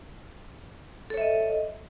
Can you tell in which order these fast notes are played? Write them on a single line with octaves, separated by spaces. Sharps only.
A4 C#5 E5 D#5